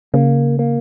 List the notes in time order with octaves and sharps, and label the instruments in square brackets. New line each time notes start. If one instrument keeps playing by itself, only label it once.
[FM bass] C#3 [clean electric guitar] A#3
[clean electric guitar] A#3